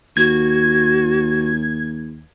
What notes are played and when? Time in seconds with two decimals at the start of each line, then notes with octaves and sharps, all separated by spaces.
0.17 D#2 F#4 G#6